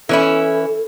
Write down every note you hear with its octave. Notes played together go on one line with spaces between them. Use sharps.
E3 C#4 E4 A4